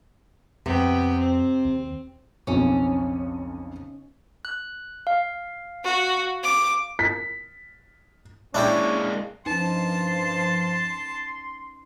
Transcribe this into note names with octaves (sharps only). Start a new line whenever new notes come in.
F2 C3 B3 G5
C4
D#2
B1 F2 C#3 C#4
F#6
F5
F#4
D6
B6
G#3 A#3 C#4 D4 E4 G4
G2 F3 C#4 D#4 B4 A5 C6